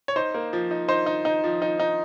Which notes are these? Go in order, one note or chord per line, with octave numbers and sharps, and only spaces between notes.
C#5
D#4 C5
A#3
F3
D#4
D#4 C5
D#4
D#4
F3
D#4
D#4